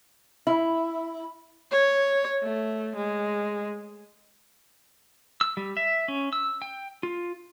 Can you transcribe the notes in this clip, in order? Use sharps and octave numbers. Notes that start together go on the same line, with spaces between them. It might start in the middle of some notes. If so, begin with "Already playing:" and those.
E4
C#5
A3
G#3
E6
G3
E5
C#4
E6
G5
F4